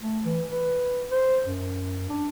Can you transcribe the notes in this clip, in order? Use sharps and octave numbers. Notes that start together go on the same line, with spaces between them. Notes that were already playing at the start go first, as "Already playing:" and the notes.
A3
E3
B4
C5
F#2
D4